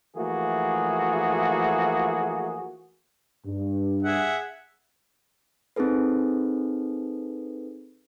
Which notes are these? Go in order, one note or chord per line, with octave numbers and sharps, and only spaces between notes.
E3 F3 A3 A#3 F#4 G#4
G2
G#4 E5 F#5
C4 D#4 G#4 A4 B4